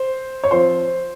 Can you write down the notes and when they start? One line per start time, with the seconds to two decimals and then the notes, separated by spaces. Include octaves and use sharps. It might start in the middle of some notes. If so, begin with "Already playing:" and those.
Already playing: C5
0.44 C#5
0.51 F3 C4 F4 C5